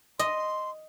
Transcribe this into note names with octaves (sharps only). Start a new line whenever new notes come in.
D#5 C6